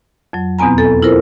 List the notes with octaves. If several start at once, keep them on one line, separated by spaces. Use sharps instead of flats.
F2 F#3
E2 B2 B3 C4 G#5 A#5
A4
E4 F4 A4 A#4 C5